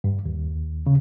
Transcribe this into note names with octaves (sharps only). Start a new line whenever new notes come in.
G2
D#2
C#3